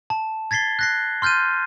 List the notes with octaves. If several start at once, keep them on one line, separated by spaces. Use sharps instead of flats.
A5
G#6 A6 B6 C7 G7
F#6 A#6 C7
C6 F6 G6 A6 D#7